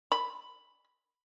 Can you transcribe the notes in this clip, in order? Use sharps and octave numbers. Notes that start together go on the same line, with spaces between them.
B5